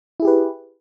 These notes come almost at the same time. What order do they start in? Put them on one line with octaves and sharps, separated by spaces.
E4 G#4 G4 B4